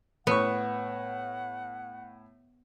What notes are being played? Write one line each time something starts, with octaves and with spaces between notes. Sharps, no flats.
A2 B3 F#5 C#6